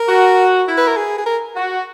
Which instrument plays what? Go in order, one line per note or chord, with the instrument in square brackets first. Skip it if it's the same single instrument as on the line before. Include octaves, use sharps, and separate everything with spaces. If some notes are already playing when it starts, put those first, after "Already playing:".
Already playing: [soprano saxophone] A#4
[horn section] F#4
E4
[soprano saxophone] B4
A#4
G#4
G#4
A#4
[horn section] F#4